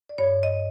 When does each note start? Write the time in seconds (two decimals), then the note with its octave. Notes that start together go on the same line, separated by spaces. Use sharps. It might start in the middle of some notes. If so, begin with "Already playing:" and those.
0.09 D5
0.18 G2 C#5
0.43 D#5